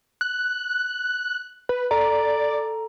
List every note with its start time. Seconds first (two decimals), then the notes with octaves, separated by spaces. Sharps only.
0.21 F#6
1.69 B4
1.91 A4 D5 A#5